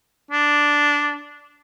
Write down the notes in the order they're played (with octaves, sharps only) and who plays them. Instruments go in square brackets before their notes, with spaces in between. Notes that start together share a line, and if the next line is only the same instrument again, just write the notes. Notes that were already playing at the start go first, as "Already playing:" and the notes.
[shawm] D4